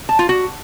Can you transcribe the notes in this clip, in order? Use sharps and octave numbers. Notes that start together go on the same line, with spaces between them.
A5
F4
F#4